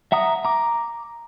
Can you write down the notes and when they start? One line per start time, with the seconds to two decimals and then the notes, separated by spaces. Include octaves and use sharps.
0.12 E5 F#5 A#5 D#6
0.45 A#5 D6